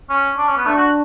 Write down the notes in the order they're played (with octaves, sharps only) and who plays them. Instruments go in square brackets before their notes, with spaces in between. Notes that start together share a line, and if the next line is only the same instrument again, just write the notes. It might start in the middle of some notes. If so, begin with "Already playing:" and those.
[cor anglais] C#4
D4
C#4
B3
[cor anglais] A3 [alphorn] D4
[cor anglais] F#4